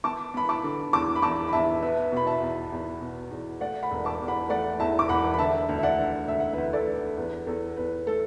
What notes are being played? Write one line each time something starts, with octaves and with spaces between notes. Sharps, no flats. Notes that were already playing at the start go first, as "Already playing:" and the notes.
B3 A5 D6
B3 B5
A5 D6
D3
E2 A5 D6
B5
E2 A5 D6
B5
E2 E5 A5
B3 B4 E5
B2 B5
E5 A5
E2
E2
B2
E2
A3 D5 F#5
F#5 B5
E1
A5 D6
E2
F#5 B5
A3 D5 F#5
E2 E5 A5
D6
E1 F#5 B5
B5
D3 E5 A5
D2
E5
D5 F#5
D3
D2 E5
F#5
D2 B4 E5
A4 D5
D3
E2 B4
E2 A4
E2 B4
A3 A4